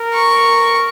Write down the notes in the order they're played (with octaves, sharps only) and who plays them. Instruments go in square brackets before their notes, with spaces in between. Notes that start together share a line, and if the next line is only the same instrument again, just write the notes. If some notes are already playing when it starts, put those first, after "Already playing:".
Already playing: [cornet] A#4
[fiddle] C#6